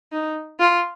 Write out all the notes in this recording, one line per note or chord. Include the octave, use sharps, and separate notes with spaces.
D#4
F4